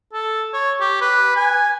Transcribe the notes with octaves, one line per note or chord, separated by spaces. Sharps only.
A4
C#5
G4
B4
G#5